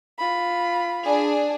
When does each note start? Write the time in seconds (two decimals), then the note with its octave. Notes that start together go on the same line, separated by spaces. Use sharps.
0.19 F4 B5
1.05 D4 G#4